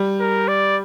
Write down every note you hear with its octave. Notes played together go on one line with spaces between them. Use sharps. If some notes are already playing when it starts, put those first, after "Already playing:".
Already playing: G3
A#4
D5